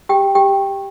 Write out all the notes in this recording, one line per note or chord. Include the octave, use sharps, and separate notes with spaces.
G4 G5
G4 G5